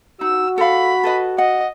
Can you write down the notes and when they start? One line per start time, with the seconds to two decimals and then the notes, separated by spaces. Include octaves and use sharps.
0.21 D#4 F#4 E6
0.58 A4 F5 B5
1.03 A4 B4 D#5
1.38 D#5 F#5